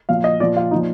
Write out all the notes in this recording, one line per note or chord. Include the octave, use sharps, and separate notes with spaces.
A#2 F3 F5
D#5
A#2 F3 D5
F4
A#2 F3 D#4